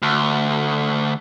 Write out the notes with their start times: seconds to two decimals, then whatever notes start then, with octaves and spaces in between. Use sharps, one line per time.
0.02 D2